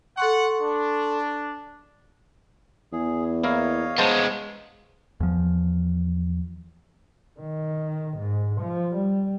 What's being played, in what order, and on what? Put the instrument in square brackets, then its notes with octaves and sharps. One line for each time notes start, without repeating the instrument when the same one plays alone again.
[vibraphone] A4 C6 C#6 [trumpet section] F#5
[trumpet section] D4
[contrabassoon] E2 [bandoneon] G#4
[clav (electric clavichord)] A#3 E4 A#4 [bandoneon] C#5 D#5 F5
[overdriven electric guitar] G#3 B3 [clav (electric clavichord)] C5 A5 A#5
[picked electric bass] E2 F3
[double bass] D#3
G#2
F3
G3